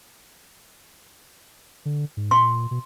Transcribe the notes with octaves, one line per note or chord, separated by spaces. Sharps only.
D3
G#2
A#2 C6
B2